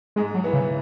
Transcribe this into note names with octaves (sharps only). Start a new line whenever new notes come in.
G#2 G#3
F#3
E3 B3 E4 B4
C#3